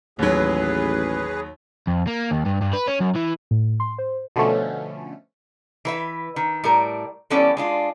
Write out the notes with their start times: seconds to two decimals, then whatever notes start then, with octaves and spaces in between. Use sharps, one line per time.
0.19 A1 D#2 F#3 G#4 B4
1.87 F2
2.07 A#3
2.31 D#2
2.45 G2
2.61 G2
2.73 B4
2.88 C#4
3.01 F#2
3.16 E3
3.51 A2
3.80 C6
3.98 C5
4.36 B2 D3 F3 A3 C#4
5.85 E3 B4 E5
6.36 D#3
6.64 A2 G3 A#4
7.30 E3 G3 B3 C#4 A4 D5
7.57 G#3 D4 F4